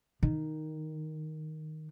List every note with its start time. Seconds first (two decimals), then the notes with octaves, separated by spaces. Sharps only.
0.23 D#3